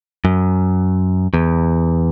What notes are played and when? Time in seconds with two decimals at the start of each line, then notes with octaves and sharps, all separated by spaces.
0.25 F#2
1.34 E2